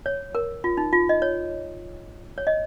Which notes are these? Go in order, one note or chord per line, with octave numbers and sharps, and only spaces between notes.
C#5
A#4
F4
D#4
F4
D#5
C#5
C#5
D#5